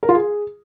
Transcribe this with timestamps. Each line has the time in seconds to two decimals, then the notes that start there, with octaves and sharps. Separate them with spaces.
0.03 A#4
0.09 F4
0.15 G#4